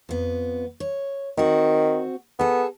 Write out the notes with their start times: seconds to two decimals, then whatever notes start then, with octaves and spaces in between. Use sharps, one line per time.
0.09 F2 B3
0.80 C#5
1.37 D#3 C4 F#4
2.39 B3 G#4 A4